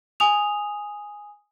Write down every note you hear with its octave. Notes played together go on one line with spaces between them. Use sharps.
G#5 D#6 F7